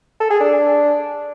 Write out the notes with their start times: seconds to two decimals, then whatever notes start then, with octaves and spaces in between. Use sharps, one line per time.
0.20 A4
0.30 G#4
0.40 D4